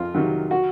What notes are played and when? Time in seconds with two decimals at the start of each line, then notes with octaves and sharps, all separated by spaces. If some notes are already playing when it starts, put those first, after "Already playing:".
Already playing: F2 F4
0.14 C3 D#3 F#3
0.51 F#4